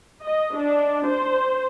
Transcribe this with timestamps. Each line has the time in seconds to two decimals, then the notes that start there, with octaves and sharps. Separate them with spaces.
0.24 D#5
0.58 D4
1.08 C5